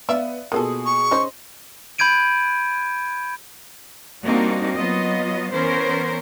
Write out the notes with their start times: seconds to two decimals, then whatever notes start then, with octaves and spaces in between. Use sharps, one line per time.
0.09 B3 D5 E5 F5
0.52 B2 A#3 F4 G#4 A4 D#6
0.86 C#6
1.11 C#3 D#4 C5
1.98 B5 G6 G#6 D7 D#7
4.23 G3 A#3 C4 D4 D#4 F#4
4.76 F#3 B3 F4 D#5
5.52 E3 B3 C#4 A#4 C5